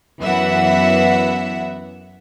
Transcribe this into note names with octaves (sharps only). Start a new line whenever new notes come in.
F#2 E3 B3 E5 F#5